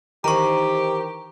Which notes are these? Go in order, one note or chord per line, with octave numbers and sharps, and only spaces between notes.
D#3 E3 G4 A#4 C5 D#5 A#5 C#6